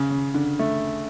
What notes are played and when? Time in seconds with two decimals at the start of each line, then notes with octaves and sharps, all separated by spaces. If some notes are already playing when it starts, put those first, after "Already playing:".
Already playing: C#3
0.10 C#3
0.34 D3
0.59 A3